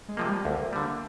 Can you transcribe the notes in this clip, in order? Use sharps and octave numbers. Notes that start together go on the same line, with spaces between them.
G#3
C3 F3 A#3
G3
D2 A#3
D3 G3